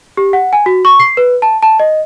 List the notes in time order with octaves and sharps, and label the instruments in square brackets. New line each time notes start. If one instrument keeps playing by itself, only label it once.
[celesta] G4
F#5
G#5
F#4
C#6
C7
B4
A5
A5
D#5